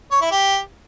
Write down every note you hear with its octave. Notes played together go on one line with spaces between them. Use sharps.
C#5
E4
G4